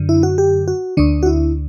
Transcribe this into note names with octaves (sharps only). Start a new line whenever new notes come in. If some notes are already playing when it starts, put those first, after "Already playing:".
Already playing: F#2 D3
E4
F#4
G4
F#4
D2 D3 D4
F#4
E4